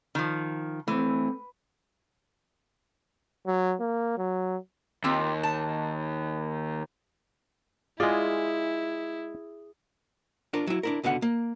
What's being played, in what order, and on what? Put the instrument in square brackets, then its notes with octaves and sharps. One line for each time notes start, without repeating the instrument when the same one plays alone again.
[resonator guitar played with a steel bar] D#3 F3
[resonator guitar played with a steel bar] E3 [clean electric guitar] A3 C4
[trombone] F#3
A#3
F#3
[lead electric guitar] D#2 [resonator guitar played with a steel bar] C4 F4 G4
[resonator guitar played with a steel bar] A5
[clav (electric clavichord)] G#3 D5 [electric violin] E4 [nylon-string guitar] F4 [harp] G#4
[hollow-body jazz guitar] D4 F4 A#4
F#3 E4
D4 E4 A#4
C#2 B2 D3 F5 F#5
A#3